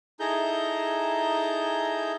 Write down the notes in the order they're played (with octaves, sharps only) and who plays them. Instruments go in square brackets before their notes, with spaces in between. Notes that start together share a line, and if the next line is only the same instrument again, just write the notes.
[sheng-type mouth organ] D#4 E4 G#4 A4 A#5 G6